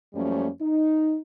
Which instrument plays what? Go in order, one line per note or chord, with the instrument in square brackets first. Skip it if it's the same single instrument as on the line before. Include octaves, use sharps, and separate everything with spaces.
[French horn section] F#2 F3 G3 A3 A#3 C#4
D#4